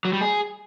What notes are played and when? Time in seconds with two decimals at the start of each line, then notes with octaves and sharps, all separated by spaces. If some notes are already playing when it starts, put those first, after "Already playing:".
0.05 F#3
0.13 G3
0.21 G#4